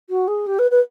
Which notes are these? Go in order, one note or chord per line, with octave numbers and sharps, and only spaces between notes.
F#4
G#4
G4
B4
B4